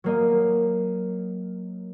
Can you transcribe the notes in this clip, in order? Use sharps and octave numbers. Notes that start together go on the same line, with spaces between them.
F#3 A#3 D#5